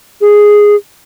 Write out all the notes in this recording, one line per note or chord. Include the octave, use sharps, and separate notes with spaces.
G#4